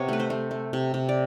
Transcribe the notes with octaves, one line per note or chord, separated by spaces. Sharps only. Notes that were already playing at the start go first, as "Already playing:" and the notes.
Already playing: C3 B3 C#5
A3 B4
C5
A3
A3
C3
C3
D5